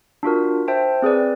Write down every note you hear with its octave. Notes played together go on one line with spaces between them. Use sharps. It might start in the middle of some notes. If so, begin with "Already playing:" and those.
D4 F4 F#4 A#4
C5 E5 G5 A5
C4 G#4 B4 D5